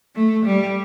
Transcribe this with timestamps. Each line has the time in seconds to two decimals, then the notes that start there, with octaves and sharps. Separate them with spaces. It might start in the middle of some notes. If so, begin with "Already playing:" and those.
0.15 A3
0.45 G3